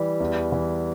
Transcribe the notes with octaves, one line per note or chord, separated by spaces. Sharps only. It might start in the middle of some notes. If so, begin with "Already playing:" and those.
Already playing: E3 G3
E2
E3